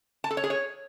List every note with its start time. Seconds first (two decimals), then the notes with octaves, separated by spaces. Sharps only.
0.24 A5
0.31 A4
0.37 C#5
0.44 G#4
0.50 C#5